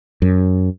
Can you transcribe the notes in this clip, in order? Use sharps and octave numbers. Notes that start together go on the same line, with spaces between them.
F#2